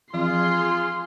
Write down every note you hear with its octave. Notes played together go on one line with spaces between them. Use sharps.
E3 F3 C4 F4 G#4 C6